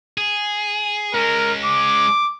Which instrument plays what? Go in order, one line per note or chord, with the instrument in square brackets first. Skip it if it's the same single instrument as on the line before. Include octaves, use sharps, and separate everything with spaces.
[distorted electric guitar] G#4
[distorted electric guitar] G#3 C#4 [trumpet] A#4
[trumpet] D6